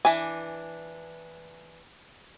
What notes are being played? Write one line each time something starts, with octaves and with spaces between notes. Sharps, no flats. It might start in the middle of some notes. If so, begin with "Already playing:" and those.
E3 D4 G#5